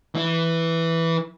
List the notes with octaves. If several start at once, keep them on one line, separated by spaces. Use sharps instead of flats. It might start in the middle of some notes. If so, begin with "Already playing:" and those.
E3 E4